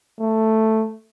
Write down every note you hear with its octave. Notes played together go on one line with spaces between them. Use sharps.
A3